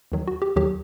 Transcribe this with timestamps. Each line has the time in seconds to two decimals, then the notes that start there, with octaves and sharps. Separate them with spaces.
0.12 D#2 D#3 F#3
0.28 F#4
0.42 G4
0.56 D#2 D#3 F#3 G4